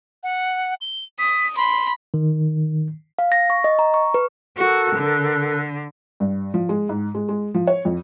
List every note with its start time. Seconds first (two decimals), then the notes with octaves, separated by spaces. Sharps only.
0.23 F#5
0.81 G7
1.19 D#6 B6
1.57 B5 C6
2.14 D#3
3.19 F5
3.32 A#6
3.50 C#6
3.64 D#5
3.79 A#5
3.94 C#6
4.14 B4
4.58 F#4 A4 A#4 F#6
4.95 D3
6.20 G2
6.54 F3
6.69 G#3
6.89 G#2
7.15 G#3
7.29 G#3
7.54 F3
7.67 C#5
7.85 F2